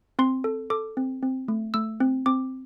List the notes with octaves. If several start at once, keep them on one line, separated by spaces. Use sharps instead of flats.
C4 C6
A4
A4 D6
C4
C4
A3
A3 E6
C4
C4 D6